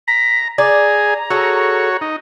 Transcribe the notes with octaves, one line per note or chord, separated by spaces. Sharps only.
A#5 B6
G#4 D5 A#5
F#4 G#4 A4 C#5
D#4